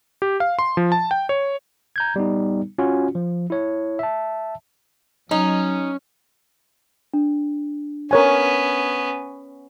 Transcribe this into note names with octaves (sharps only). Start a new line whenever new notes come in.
G4
F5
C6
F3
A5
G5
C#5
A#5 G6 G#6
G3 B3 D#4
C#4 F4 F#4
F3
E4 C#5
E5 A5
F#3 C#4 D#4
D4
B3 C#4 A#4 C#5 G#5